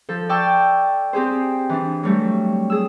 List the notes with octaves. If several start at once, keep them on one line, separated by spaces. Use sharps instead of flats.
F3 A4
D5 G5 A5 C#6 E6
C4 G4 G#4 C5
E3 D4
F#3 G3 A3
G#4 E6